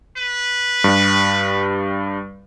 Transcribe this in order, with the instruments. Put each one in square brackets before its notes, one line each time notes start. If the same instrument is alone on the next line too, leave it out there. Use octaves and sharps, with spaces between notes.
[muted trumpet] B4
[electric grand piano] G2 G3